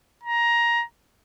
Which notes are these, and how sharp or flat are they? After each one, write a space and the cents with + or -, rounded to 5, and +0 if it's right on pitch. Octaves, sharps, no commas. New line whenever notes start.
A#5 +15